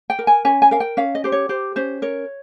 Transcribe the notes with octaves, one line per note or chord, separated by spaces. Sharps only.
G5
A#4
G#5
C#4 G#5
G#5
A#4 F5
G5
C#4 F5
D#5
G4 C5
C#5
G4 C5
C#4 C5
A#4 C#5